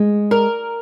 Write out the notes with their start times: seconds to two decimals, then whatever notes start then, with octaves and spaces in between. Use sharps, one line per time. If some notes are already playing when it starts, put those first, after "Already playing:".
Already playing: G#3
0.31 A#4 D5